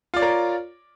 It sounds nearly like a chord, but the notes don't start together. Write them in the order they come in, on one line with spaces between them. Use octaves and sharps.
F4 D5 C#5 A#4